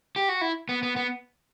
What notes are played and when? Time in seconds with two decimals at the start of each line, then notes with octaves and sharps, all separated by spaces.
0.16 G4
0.29 F#4
0.41 E4
0.69 B3
0.83 B3
0.96 B3